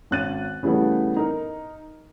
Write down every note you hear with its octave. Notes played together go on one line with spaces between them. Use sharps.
G#1 C#4 F#6 A6 D#7
C#3 E3 G3 A3 B3
D#4 A#4